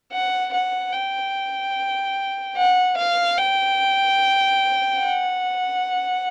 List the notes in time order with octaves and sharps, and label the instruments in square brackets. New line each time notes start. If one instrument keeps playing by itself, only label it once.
[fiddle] F#5
F#5
G5
F#5
F5
G5
F#5